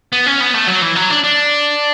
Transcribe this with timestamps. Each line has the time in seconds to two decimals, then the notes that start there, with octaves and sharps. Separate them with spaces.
0.12 B3
0.26 C#4
0.41 B3
0.54 A3
0.68 F#3
0.82 E3
0.96 F#3
1.10 D4
1.24 D4